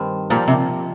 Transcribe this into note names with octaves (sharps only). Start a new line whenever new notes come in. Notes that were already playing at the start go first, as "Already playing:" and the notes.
Already playing: G2 D#3 C4
A#2 F3 A#3 G4
C3